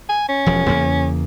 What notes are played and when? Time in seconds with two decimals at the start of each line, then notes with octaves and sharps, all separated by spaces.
0.09 G#5
0.28 C#4
0.46 E1 F3
0.68 E2 C#3 A#3